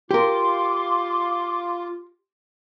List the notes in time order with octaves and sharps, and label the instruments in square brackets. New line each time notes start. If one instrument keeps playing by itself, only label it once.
[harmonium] F4 [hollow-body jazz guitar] G4 A#4 [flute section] C6 D6